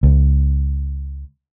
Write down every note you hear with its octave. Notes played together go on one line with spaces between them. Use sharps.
C#2